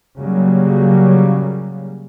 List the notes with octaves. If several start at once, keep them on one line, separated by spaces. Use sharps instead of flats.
C#3 F#3 G3 A#3